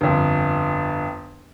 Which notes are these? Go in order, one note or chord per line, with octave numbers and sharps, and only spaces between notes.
G1 F2